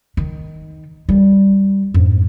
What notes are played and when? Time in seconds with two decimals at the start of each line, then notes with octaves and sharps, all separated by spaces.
0.17 D#3
1.09 G3
1.94 F2 G#2